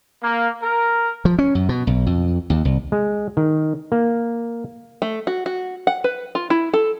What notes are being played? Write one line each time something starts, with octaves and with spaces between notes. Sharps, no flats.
A#3
A#4
F3
C#4
F#2
B2
B1
F2
D#2
C2
G#3
D#3
A#3
A3
F#4
F#4
F#5
B4
F4
E4
A4